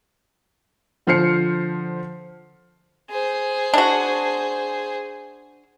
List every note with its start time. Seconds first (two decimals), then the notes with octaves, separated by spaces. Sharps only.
1.07 D3 F3 C5 F6 C7 C#7
3.11 G#4 C5
3.74 D4 F#4